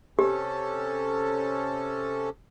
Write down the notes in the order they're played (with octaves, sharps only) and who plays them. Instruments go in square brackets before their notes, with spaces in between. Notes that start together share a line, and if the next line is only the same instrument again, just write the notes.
[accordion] C3 C#4 A4 [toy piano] G4